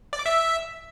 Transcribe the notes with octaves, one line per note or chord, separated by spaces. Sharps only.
D5
D6
E5